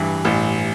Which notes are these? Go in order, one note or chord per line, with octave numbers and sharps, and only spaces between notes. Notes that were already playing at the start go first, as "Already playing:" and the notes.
Already playing: A1 G2 E3
A1